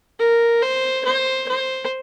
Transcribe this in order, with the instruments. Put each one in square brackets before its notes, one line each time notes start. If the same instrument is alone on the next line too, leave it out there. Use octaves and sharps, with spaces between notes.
[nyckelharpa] A#4
C5
C5
C5